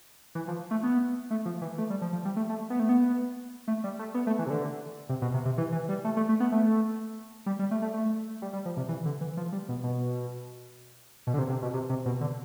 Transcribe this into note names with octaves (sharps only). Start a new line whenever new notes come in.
E3
F3
A3
B3
A3
F3
E3
A3
G3
F3
F3
G3
A3
A3
B3
A3
B3
A3
G3
A3
B3
A3
E3
C3
D3
C3
B2
C3
C3
E3
E3
G3
A3
A3
A3
B3
A3
G3
G3
A3
A3
A3
G3
G3
F3
C3
E3
D3
E3
F3
G3
B2
B2
B2
D3
C3
C3
B2
C3
C3
B2
D3